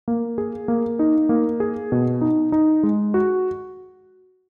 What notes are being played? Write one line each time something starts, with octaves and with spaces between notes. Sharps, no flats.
A#3
G#4
A#3
D#4
A#3
G#4
B2
D#4
D#4
G#3
F#4